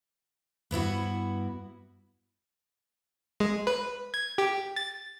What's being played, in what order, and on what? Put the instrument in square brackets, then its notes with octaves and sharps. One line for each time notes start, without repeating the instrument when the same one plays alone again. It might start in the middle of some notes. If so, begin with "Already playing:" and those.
[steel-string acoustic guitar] G2 B3 E4 F#4
[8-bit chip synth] G#3
B4
G#6
G4
A6